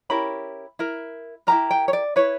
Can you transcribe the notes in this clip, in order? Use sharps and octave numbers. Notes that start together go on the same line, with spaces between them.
C#4 E4 G4 A#4 B5
E4 A#4
E4 G4 A#4 A#5
G5
C#5
D5
E4 B4 C#5